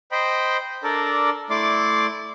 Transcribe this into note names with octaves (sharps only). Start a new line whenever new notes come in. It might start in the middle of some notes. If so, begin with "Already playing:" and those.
C5 D#5 G5 B5
D4 A4 A#4 D5
A3 E4 D5 C6 D6